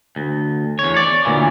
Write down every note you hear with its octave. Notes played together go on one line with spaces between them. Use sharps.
D2
E2 C#5
C#5 D5
D2 A#2 E3